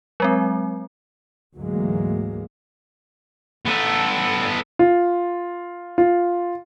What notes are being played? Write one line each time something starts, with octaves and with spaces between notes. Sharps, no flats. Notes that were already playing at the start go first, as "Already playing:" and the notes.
F#3 G#3 C4
D2 G#2 E3 F#3 G#3 A#3
B3 A4
F4
F4